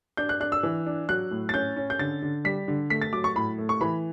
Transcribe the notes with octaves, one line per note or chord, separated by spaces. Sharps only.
D4 G6
F#6
D4 F#6
E6
E3
D4
F#3 F#6
A2
A6
C#4 G6
C#4
G6
D3 A6
D3
G3 B6
D3
A3 B6
A6
F#3 D6
C#6
A2 B5
A3
C#6
E3 B5